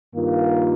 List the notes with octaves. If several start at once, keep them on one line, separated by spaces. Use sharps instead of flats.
G2 D#3 A#3 F4